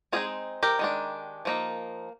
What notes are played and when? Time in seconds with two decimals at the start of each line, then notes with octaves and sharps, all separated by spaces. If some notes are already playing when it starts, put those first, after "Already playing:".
0.12 G#3 C4 D#4 F4 G#4
0.63 G4 A#4
0.79 D#3 G#3 D4
1.45 F3 A#3 D#4